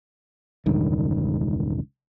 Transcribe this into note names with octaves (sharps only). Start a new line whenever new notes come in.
E1 C#2 G2 D#3